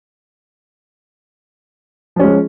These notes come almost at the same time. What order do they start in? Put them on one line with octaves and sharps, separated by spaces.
F3 C#4 G#3